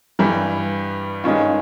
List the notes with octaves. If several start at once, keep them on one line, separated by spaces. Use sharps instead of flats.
G2 E3 G3
G2 D#3 G#3 C#4 F4